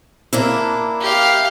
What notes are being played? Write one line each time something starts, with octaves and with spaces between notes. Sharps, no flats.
A#3 D4 E4
G4 F5